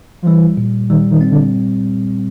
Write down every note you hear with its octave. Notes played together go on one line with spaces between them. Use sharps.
F3
E3 G3
A#2
D#3 G3
D#3
C4
D3